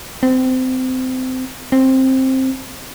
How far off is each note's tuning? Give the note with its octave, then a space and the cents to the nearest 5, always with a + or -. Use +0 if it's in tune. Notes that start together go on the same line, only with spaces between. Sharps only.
C4 -25
C4 +10